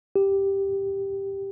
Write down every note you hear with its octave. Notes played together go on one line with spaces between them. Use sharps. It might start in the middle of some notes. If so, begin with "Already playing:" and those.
G4